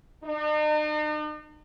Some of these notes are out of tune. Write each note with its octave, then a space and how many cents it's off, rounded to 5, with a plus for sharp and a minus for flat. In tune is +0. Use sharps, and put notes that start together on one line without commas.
D#4 -45